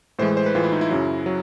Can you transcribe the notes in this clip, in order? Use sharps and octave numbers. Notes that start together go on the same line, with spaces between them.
A2 E3 G#3 C5
C5
B4
A2 E3 G#3 F4
E4
D#4
E4
F#2 C#3 F#3
F#3